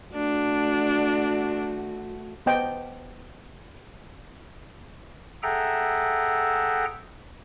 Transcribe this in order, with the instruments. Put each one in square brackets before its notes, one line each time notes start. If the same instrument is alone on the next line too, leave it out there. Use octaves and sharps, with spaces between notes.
[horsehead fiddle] A3 F#4 [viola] D4
[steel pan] B3 C5 D#5 G5 A5
[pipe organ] G#4 A4 E5 F#5 G5 A#5